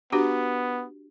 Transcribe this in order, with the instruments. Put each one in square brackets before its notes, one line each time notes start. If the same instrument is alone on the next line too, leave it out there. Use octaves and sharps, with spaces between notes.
[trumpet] B3 [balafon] D4 F#4 G4